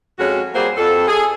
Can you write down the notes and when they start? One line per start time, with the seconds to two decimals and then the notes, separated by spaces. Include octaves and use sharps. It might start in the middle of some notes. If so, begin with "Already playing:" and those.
0.19 F2 G#3 C#4 F#4
0.54 G3 A#3 C4 F#4 G#4 C5
0.77 F2 A4
1.08 G#4